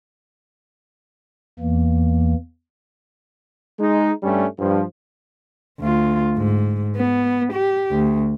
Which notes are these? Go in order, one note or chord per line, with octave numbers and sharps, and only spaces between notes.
E2 E3 A#3
G#3 D#4
G2 G3 A3 C#4
G2 F3
D2 F4
G#2
B3
G4
D2